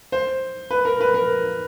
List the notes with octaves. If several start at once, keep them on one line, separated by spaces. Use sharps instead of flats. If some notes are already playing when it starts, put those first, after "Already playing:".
C5
B4
A#4
B4
A#4